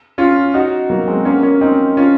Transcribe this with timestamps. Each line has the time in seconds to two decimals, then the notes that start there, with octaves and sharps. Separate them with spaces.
0.18 C#4 F4
0.54 D#4 F#4
0.90 F#3 A#3
1.08 G#3 C4
1.25 A#3 C#4
1.43 A#3 C#4
1.61 C4 D#4
1.97 C#4 F4